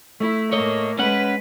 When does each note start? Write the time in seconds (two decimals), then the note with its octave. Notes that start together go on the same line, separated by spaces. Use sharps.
0.20 A3 E4
0.53 A2 A#3 C#5 D#5
0.99 G#3 C#4 B4 F#5